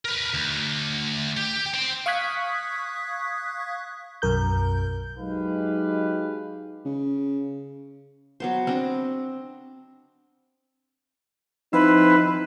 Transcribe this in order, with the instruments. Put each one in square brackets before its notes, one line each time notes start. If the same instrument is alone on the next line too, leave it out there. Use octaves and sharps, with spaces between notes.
[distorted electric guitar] A#4 B4
D2
G4
C5 G5
[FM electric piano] F5 C#6 D#6 F#6 G#6 B6
B1 F#2 A#4 G6
[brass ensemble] F#3 G#3 D#4 G4 B4 F5
[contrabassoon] C#3
[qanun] F#3 B3 C5
C4 D4 D#5
[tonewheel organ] F3 C4 E4 [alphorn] D#4 [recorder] B4